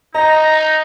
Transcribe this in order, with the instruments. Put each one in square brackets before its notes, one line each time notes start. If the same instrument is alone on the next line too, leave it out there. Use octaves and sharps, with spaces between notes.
[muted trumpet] D#4 [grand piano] D#5 [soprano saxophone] A#5